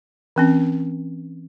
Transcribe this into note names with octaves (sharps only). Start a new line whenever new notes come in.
E3 C4 C#4